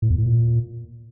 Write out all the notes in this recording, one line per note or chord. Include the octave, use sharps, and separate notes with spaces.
A2
E2
A2
A#2